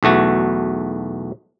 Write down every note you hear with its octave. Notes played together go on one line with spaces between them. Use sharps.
B1 E2 A3 F#4